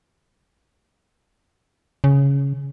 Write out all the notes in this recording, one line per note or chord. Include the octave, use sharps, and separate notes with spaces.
C#3